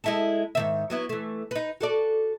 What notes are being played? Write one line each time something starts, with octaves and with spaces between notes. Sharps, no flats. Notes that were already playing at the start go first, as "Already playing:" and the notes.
G#3 E4 A4
G#2 D#3 E5
F#3 B3 E4
E3 A3
D#4 B4
F#4 A4 D5